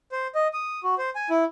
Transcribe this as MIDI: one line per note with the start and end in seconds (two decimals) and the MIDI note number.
0.12 0.27 72
0.35 0.48 75
0.53 0.80 87
0.83 0.95 66
0.98 1.10 72
1.15 1.29 80
1.30 1.44 64